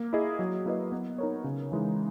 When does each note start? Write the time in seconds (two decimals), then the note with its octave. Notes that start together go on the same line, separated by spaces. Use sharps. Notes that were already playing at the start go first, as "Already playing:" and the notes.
Already playing: A#3
0.13 E4 G#4 D#5
0.39 F#3
0.66 A#3 E4 B4 D#5
0.92 B3
1.18 D#4 A#4 C#5
1.44 C#3
1.72 E3 G#3 D#4